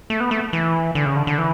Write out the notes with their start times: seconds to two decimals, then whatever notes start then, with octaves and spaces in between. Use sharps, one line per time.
0.10 A3
0.20 B3
0.31 A3
0.53 E3
0.95 D3
1.06 C#3
1.16 D3
1.27 D3
1.38 E3